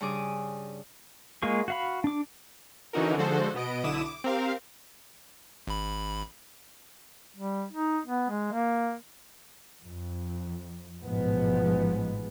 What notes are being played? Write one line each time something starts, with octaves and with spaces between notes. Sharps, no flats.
G2 C#3 G#4 D6 D#6
G#3 A#3 F4 G#4 C#6
F#4 F5 B5
D4 D6
D3 E3 C#4 D#4 F#4 A#4
D3 F3 G#3 F#4 A4 C5
B2 B3 D#5 D7
B1 D3 E4 D6 D#6 E7
D6
C4 G4 A#4 F5
G#1 B5
G3
D#4
B3
G#3
A#3
F2
A1 G#2 B2 F3 G#3 B3